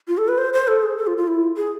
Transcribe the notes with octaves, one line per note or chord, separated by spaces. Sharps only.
F4
A4
B4
C5
C5
A4
G#4
A4
F4
F4
E4
G#4